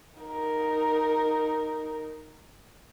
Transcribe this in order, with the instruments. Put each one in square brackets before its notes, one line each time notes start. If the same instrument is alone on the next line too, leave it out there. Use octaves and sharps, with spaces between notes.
[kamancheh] D#4 A#4